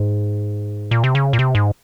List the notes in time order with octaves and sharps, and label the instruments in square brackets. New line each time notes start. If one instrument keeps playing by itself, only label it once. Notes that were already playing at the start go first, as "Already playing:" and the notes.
Already playing: [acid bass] G#2
A#2
C3
C#3
A#2
C3
G#2